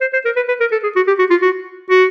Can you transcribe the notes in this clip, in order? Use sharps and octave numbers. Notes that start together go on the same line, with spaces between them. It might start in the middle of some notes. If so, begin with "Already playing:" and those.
C5
C5
A#4
B4
B4
A#4
A4
G#4
F#4
G4
F#4
F4
F#4
F#4